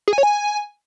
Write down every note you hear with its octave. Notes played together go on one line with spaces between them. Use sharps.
G#4
G#5
C#5
G#5